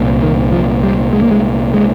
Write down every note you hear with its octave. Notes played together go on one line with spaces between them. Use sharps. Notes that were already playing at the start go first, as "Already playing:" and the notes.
Already playing: C2 A#2
D#3
F3
G3
G#3
A#3
G#3
G#3